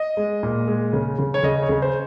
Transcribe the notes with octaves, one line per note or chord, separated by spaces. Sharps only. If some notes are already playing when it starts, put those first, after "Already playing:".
Already playing: D#5
G#3
A#2
G#3
C#3
C#3
C#5
C#3 D#5
C#5
C#3
C5